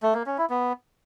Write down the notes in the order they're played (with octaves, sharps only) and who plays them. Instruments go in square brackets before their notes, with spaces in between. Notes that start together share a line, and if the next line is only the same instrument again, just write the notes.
[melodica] A3
A#3
C#4
E4
B3